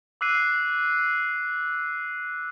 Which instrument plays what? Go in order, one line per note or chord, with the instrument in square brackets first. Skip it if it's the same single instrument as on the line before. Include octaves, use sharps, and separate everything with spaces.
[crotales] D6 E6 F#6 C7 D#7